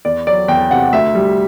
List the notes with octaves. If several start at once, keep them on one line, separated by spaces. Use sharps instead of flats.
E2 D5
F#3 D5
E2 G5
C3 F#5
D2 E5
G3